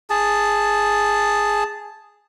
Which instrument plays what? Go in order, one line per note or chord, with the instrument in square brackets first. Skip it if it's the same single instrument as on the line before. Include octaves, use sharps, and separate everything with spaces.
[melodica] G#4 A5